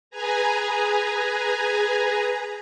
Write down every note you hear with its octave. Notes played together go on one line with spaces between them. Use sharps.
G#4 B4 G#5 A#5